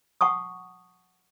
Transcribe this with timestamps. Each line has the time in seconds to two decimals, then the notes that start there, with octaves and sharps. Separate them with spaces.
0.21 F#5 A5 C#6 D#6